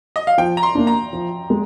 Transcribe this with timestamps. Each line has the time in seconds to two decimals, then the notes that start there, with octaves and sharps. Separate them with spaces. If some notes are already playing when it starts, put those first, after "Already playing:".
0.16 D#5
0.27 F5
0.38 F3 G5
0.57 A#5
0.63 C6
0.75 A#3 D4
0.87 A#5
1.13 F3
1.50 G#3